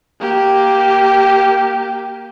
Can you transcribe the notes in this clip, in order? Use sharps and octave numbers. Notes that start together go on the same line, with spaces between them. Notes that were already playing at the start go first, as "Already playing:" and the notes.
A#3 G4